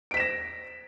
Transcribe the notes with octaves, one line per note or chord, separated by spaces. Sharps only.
A#6 B6 D7 E7